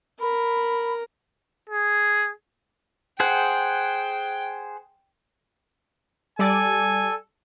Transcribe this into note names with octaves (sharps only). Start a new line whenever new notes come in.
A#4 B5
G#4
G#4 C5 F#5 G5
G3 A4 D5 G#5